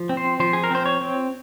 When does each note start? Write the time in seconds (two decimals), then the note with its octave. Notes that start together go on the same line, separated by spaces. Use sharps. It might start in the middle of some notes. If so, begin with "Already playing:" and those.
Already playing: F3
0.09 C4
0.17 C5
0.40 F3 C5
0.53 G#4
0.64 A#4
0.71 C4 C5
0.86 C#5
1.01 C4